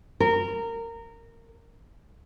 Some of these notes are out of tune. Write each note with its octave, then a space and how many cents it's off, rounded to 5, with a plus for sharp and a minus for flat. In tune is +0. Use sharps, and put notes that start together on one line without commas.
A#4 -20